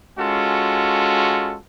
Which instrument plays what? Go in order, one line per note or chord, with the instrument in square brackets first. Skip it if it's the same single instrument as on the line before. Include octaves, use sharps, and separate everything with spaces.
[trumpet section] G#3 C#4 F4 F#4 A4